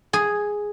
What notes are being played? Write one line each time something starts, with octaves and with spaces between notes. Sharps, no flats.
G#4